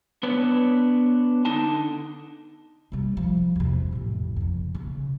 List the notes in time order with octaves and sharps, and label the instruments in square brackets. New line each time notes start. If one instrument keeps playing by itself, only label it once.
[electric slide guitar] B3 D4 B4 C#5
D3 D#4 A5
[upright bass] C3 G3
F3 G3
E2 C3
A1 F2
F2 C#3
C#3